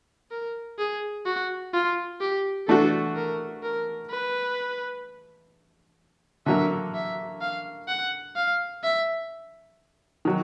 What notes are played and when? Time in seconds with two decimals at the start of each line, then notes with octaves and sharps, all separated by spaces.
0.31 A#4
0.79 G#4
1.26 F#4
1.74 F4
2.21 G4
2.68 E3 A3 D4 F#4 A4
3.16 A#4
3.63 A#4
4.10 B4
6.46 D3 F#3 A#3 E5
6.94 E5
7.41 F5
7.88 F#5
8.36 F5
8.84 E5
10.25 D#3 F#3